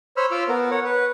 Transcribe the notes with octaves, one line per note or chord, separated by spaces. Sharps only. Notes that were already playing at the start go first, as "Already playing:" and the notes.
C5 C#5 B5 E6 F6
F4 D6 E6 F6
B3 A#4
C#5 F#5
B4